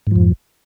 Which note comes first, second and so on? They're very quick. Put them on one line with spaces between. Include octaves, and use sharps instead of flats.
G#2 F3 F2